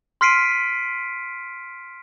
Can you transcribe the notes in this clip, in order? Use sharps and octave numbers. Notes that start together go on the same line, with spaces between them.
C6 F6 B6 C7 D7 D#7